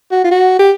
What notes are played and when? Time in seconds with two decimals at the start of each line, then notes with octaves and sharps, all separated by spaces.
0.11 F#4
0.24 F4
0.31 F#4
0.59 G4